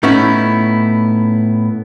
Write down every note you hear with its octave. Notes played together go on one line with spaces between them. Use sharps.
A2 B3 C#4 D#4 E4